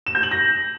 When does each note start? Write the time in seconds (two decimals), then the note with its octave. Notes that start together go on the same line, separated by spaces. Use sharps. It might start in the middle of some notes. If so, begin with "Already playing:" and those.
0.07 E7
0.15 G6
0.23 F#7
0.31 A#6